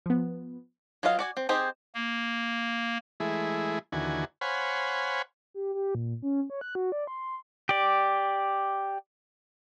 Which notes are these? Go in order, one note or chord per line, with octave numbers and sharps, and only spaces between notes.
F3 B3
F#3 F4 B4 D#5 F5
F#4 D5 G#5
C4
C4 D#4 G4 G#4 C5
A#3
E3 G#3 A3 E4 G#4
D#2 D3 E3 F#4 G#5
C5 C#5 F5 F#5 G#5 B5
G4
G4
A#2
C#4
C#5
F#6
F#4
D5
C6
G4 D5